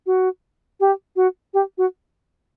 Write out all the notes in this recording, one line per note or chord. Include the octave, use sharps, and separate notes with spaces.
F#4
G4
F#4
G4
F#4